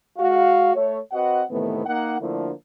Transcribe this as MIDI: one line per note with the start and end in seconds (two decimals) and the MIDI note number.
0.18 0.74 56
0.18 0.74 66
0.18 0.74 77
0.75 0.98 57
0.75 0.98 73
1.12 1.42 60
1.12 1.42 66
1.12 1.42 71
1.12 1.42 75
1.12 1.42 78
1.50 1.84 45
1.50 1.84 48
1.50 1.84 51
1.50 1.84 52
1.50 1.84 57
1.50 1.84 59
1.86 2.19 58
1.86 2.19 63
1.86 2.19 78
2.20 2.51 50
2.20 2.51 53
2.20 2.51 57
2.20 2.51 58
2.20 2.51 62
2.20 2.51 64